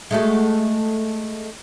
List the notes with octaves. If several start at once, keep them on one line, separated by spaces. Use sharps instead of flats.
G#3 A3 F#4